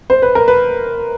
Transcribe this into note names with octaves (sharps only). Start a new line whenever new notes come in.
C5
B4
A#4
B4